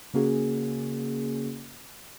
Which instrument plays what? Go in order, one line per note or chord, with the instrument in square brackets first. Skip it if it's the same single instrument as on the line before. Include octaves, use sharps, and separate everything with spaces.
[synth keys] C#3 A#3 C#4 F#4 G#4